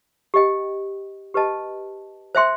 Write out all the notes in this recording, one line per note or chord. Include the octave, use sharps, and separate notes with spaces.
G4 D#5 G5
G4 B4 D#5 A5
C5 E5 G5 C6